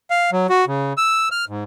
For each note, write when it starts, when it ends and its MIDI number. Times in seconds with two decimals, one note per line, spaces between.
0.10 0.30 77
0.32 0.47 54
0.49 0.65 66
0.67 0.93 49
0.97 1.29 88
1.31 1.45 89
1.49 1.64 44